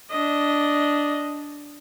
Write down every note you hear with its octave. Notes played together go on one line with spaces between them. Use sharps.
D4 D#5